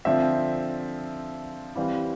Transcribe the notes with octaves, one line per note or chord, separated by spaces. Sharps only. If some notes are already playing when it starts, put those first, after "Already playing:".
D3 F3 C4 E5
E3 G3 C4 F5